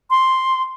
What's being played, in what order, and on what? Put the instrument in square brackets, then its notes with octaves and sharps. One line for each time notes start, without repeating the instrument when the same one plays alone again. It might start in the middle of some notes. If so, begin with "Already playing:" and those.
[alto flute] C6